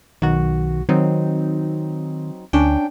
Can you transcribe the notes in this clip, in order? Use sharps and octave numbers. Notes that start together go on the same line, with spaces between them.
B1 D#3 F#4
D#3 F#3 C4 D#4
D2 C#4 D4 G5